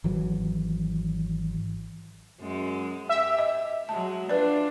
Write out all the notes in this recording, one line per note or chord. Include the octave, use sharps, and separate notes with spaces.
G#1 E3 F#3
F#2 G#3
G4 E5
D#5
F#3 G#3 A5
D4 F4 B4 D5